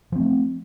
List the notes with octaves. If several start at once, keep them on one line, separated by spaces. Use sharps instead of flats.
F3 A3 C4